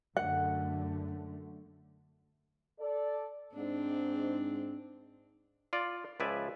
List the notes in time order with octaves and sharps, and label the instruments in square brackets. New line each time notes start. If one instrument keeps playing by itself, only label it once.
[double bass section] F#2 D3 A3 [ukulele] F#5
[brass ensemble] A4 D5
[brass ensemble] G#2 [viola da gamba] C4 D4
[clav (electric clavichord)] F4 D5
C#2 F3 B4 D5 E5 G#5